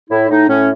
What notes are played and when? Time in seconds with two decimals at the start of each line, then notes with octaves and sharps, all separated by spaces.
0.10 A2 E4
0.30 A2 D#4
0.49 A2 C#4